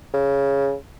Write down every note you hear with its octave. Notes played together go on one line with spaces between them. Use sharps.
C#3